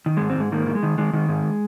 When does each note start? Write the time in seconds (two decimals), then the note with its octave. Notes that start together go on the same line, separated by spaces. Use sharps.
0.06 D#3
0.17 G#2 G#3
0.30 C4
0.37 G#2 G#3
0.52 D#3 A#3
0.67 D#3
0.75 G#3
0.83 D#3
0.98 D#3 G#3
1.13 D#3 G#3
1.29 G#2 G#3